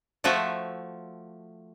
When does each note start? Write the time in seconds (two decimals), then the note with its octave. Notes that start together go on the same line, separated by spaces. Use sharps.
0.24 F3 A3 F4 F#4 E5